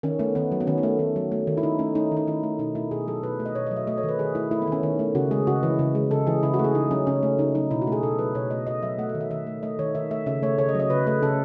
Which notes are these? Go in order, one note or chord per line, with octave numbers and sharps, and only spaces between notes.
D#3 C#4
A3 B3
D#3 B3
F#3
B3
D#3 C#4
B3
A3
D#3
F#3
A3
D#3
E4
D#3 D#4
A3 C#4
A3 D#4
D#3
D#4
D#3 E4
A3
B2 D#4
A3 E4
B2 G#4
F#3 A4
B2 B4
A3
D#5
B2 C#5
F#3 D#5
E5
A3 D#5
C#5
D#3
B4
D#3 G#4
A3 E4
A3 E4
B3
D#3 C#4
D#3
A3
C#3 F#4
G#3 G#4
C#3 F#4
E3 E4
C#3
G#3
C#3 A4
E3 G#4
C#3 E4
F#4
A3 G#4
C#3 D#4
F#3 C#4
C#3 C#4
A3
C#3 D#4
F#3 D#4
B2 E4
F#4
A3 G#4
B2 A4
F#3 B4
B2 C#5
A3 D#5
B2 D#5
F#3 E5
A3 F#5
E5
D#3
E5
D#3 E5
A3
A3 D#5
D#3 C#5
D#3 E5
A3 E5
C#3 E5
A3 C#5
C#3 C#5
D#5
F#3
D#5
C#3 B4
A3 B4
C#3 A4